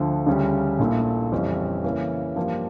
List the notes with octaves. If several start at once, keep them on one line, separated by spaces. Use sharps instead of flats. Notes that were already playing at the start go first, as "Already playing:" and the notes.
Already playing: D2 D3 F3
D2 C#3 G3 C#4
A#1 A#2 A3 E4
F2 C#3 E3 G3 C#4
C#3 E3 A#3 C#4
G2 F3 A#3 D4 G4